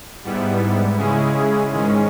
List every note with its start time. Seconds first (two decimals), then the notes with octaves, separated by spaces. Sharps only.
0.24 G#2 G3 B3 E4
0.97 C#3 G#3 C#4 E4 G#4
1.70 G#2 D#3 G#3 C#4